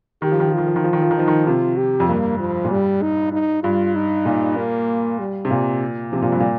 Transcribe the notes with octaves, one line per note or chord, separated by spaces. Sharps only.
D#3 G4
F3
D#3
F3
D#3 F4
F3
D#3
F3 F4
D#3
F3
D#3
F3 D#4
D#3
C3 F4
G4
F2
G2 A#3
F3
A#2
G2 G3
D#4
D#4
G2 F4
D#4
A#2
A#3
G3
C3
A#2
C3 F3
A#2
G2
A#2